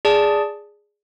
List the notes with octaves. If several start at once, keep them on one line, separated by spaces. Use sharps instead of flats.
G#4 D5 A5